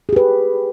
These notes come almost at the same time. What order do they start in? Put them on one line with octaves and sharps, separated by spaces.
G#4 G4 B4